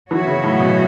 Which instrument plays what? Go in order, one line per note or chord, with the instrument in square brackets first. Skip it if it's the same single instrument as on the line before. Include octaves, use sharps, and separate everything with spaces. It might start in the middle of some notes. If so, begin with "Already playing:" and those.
[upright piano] E3 [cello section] F#3 B3 F#4 C#5 E5
[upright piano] C#3
A2
B2